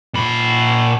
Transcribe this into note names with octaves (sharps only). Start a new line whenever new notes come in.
A#2 B5